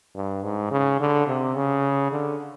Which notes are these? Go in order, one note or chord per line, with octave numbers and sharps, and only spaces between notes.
G2
G#2
C#3
D3
C3
C#3
D3